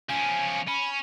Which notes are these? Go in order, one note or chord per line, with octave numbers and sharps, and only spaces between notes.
F3 C#4 G#5
C#4 B5